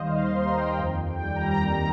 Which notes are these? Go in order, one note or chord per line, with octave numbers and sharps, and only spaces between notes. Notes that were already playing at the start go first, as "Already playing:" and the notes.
Already playing: D#2 D#3 G3 C5 D#5 F5
C6
C6
D#2 A#5
G5
F2
G5
G3
A#5
D#3 A#5